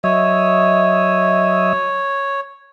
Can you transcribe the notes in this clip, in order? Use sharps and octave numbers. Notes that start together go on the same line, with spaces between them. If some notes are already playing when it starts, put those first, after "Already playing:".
F#3 C#5 D#5 E5